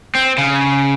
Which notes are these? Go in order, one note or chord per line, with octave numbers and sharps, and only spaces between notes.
C4
C#3